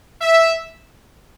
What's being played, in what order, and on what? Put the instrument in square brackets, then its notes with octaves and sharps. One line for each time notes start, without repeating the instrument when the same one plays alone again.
[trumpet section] E5